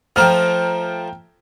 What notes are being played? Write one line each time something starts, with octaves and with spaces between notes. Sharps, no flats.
F3 A3 G5 A#5 F6